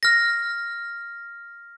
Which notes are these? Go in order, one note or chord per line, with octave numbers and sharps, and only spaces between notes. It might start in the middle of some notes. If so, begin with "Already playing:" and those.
F6 A#6